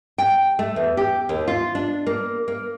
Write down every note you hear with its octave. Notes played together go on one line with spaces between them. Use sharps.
G5
A3
E2
G4
D#2
F4
D4
A#3
A#3